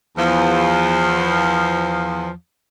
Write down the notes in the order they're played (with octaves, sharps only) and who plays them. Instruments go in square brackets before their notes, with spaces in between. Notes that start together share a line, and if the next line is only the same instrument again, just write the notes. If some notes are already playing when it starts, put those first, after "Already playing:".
[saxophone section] E2 F3